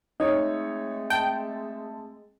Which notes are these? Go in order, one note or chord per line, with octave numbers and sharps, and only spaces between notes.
G#3 A3 C4 D#4 C#5 D#5
G5 A5